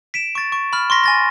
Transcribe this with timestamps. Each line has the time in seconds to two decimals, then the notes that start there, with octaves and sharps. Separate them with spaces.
0.14 B6 D7 E7
0.35 C#6 A6
0.52 C#6
0.73 B5 F6
0.90 C6 C#6 A#6 B6
1.04 G#5 A6 A#6